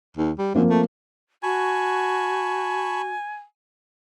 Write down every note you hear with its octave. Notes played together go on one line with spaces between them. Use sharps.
D#2
G3
F#2 F3 A#3 C4
A3
F#4 G#5 A5 B5 C#6